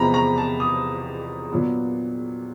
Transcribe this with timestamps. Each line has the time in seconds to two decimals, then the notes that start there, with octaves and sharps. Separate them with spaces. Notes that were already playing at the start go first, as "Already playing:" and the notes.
Already playing: E2 C3 F3 G#3 B3 A#5 B5
0.14 A#5
0.38 A5
0.60 D#6
1.51 A#2 F#3 B3 D4